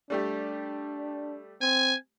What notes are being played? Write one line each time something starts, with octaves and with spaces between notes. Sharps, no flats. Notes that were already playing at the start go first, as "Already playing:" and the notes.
G3 A3 D4 G4
C4 G#5